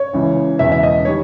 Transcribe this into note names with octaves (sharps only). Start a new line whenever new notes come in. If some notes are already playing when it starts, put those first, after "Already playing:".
Already playing: C#5
C#2 C#3 E3
E1 E2 C#3 E5
E5
D#5
D#3 G3 C#5